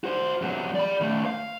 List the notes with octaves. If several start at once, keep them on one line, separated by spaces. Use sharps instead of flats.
F#4 C5
E2 F#3
D5 B5
D#3 A3
F5